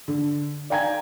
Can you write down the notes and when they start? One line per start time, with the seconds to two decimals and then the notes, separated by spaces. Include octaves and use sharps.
0.08 D3
0.70 D5 F5 G5 G#5 A#5 G#6